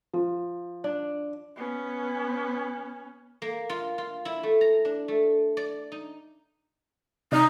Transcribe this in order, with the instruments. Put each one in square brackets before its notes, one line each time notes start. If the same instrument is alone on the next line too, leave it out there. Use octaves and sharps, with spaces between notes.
[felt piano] F3
[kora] D4
[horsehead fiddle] B3 C#4
[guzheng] A#3
F4
F4
E4
A3
A#5
D4
A3
D5
D#4
[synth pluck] C3 D5 F6 [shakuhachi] D#4